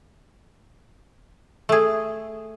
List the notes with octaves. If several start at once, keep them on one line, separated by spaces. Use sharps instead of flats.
A3 G#4